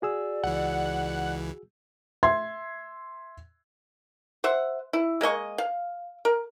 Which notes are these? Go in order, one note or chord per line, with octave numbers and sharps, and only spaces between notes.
F#4 G#4 D5 E6
C#2 E3 F#5
E5 C6 G#6
C5 E5 F#5
E4
G#3 A#3 D#5 C#6
F5
A#4